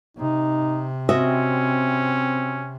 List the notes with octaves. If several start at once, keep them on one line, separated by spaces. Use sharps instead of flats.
C3 D#4
C4 C#4 F#4 D#5 E5